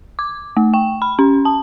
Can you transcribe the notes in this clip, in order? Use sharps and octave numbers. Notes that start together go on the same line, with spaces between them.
D6
A3
G5
B5
C#4
A5